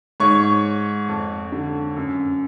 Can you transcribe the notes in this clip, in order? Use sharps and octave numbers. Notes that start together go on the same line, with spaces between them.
G#2 C#5 C#6
F2
D3
F#2